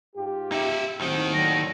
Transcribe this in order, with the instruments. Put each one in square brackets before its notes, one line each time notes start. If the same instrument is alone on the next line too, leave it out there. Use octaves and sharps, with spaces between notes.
[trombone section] G#2 F4 G4
[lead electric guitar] D#4 E5
[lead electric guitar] D#2 D#3 [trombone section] A2 F#3 C4
[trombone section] A2 D3 F#3 [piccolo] A#6